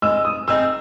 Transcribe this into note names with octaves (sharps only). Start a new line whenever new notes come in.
G#3 E6
D#6
C4 D#4 G#4 C5 E6